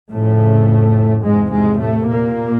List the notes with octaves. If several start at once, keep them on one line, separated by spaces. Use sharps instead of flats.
F2 A2 C#3 A3
E2 G#2 C3 G#3
G#2 G#3
A2 A3
A#2 A#3